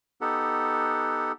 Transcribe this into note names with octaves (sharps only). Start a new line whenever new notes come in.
B3 D#4 G4 A4 F#5